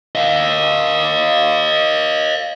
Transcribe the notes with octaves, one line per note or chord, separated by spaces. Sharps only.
D#5 F5